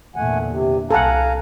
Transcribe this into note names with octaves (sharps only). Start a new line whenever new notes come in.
E2 A#2 D3 A3 F#5 G#5
C3
C2 A4 F5 F#5 G#5 A#5